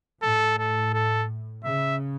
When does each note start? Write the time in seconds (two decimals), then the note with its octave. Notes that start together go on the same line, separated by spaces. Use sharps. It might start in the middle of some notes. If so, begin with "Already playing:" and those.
0.22 A2 A4
0.59 A4
0.94 A4
1.64 C#3 E5